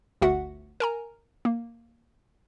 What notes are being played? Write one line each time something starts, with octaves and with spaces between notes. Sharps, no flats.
G1 D2 F#4 E5 F#5
A#4 G#5 A#5
A#3